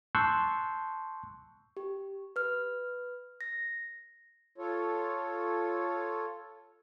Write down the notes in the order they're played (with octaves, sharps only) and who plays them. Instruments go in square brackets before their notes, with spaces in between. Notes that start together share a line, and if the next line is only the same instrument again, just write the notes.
[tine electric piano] A5 C6 C#6 E6 F#6 G6
[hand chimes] G4
B4 F6
A#6
[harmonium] F4 A4 C#5